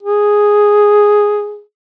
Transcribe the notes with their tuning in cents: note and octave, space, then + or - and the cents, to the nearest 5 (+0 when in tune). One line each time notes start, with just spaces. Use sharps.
G#4 +0